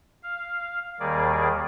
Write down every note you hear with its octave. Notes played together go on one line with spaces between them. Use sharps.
F5
D#2 D#3 G3 A#3 G#4 D5